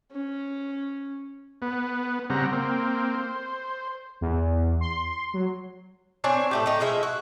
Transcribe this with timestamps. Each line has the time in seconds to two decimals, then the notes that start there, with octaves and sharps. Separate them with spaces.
0.12 C#4
1.62 B3
2.30 C#3 G3 C4 F#5 A#5
2.53 A#3 C4
3.15 C5
4.21 E2
4.81 C6
5.34 F#3
6.24 C4 D4 C#5 G#5
6.51 A2 A3 G4
6.66 A3 D#4
6.80 F3 G#3 E5
7.03 F#4